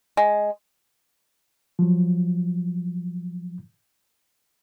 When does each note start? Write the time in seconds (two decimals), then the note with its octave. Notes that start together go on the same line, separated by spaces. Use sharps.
0.17 G#3
1.79 F3 F#3